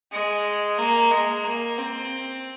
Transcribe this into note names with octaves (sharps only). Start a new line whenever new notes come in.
G#3
A#3
G#3
A#3
C4